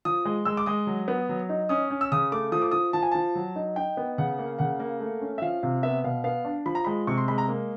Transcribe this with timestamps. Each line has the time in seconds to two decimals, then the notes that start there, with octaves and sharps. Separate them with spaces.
0.05 F3 D#6
0.25 G#3
0.45 G#3 E6
0.57 D6
0.66 G#3 D#6
0.87 F#3
1.08 B3
1.29 F#3
1.49 D#4
1.69 C#4 D#6
1.90 C#4
2.01 E6
2.12 C#3 D#6
2.32 A3 D6
2.52 F3 D#6
2.62 D6
2.71 F3 D#6
2.93 F3 A5
3.03 G#5
3.11 F3 A5
3.35 F#3
3.56 D#4
3.76 D#4 G5
3.97 B3
4.18 C#3 F#5
4.39 A#3
4.59 C#3 F#5
4.80 A#3
5.00 A3
5.21 C#4
5.38 E5
5.42 F3 F5
5.63 C3 F5
5.83 B3 E5
6.04 B2 F5
6.24 B3 F5
6.45 D4
6.66 F3 B5
6.75 A#5
6.84 G#3 B5
7.07 C3 C#6
7.18 C6
7.28 G#3 B5
7.38 A#5
7.48 A#3